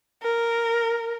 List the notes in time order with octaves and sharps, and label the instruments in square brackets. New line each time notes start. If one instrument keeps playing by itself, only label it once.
[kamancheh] A#4